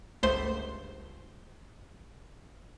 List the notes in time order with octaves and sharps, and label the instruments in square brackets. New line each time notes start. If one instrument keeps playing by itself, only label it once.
[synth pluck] G1 C#2 A3 C5 C6